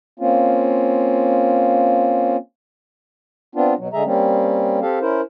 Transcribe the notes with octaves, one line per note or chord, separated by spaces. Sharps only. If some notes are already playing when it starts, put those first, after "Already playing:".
A#3 C4 C#4 F4
B3 C4 D4 F4
B2 F#3
D3 G#3 G#4 E5 A#5
G3 A#3 C4 C#4
C4 G4 A4 F5
C#4 E4 A#4 C5